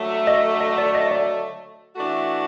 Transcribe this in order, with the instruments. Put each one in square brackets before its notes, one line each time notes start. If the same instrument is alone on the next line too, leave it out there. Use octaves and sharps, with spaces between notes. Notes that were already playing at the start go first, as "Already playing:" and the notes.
Already playing: [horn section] D3 F#3 A3
[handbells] D#5
D#5
D5
D#5
D5
[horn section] E3 A3 D4 F#4